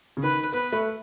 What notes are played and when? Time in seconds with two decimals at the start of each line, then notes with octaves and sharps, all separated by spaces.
0.17 C#3
0.23 D#3 B4
0.52 B3 B4
0.72 A3